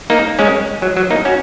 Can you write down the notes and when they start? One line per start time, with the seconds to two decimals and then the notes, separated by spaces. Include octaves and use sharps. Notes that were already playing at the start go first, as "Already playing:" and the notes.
0.10 A#3 D#4
0.39 G#3 C#4
0.82 F#3
0.97 F#3
1.10 A#3 D#4
1.25 C#4 F#4